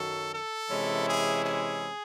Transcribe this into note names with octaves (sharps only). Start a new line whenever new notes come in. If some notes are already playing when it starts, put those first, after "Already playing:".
Already playing: F#2 D#3 F#3 A4
A4
C3 E3 G#3 C#4 E4
G#4
G#4